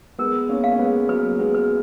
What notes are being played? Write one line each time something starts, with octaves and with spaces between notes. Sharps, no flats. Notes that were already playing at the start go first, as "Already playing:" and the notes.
G#3 B3 A#4
A#3 C#4
F5
C#4
G#3 B3
F#3 A#3 B4
G#3 B3
B4